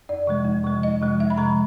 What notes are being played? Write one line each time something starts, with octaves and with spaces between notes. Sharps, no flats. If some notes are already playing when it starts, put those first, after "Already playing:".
F2 D5
C3 F3 G#3
F2
C3 F3 G#3
F2 D#5
C3 F3 G#3
F2 E5
B5
C3 F3 G#3 A#5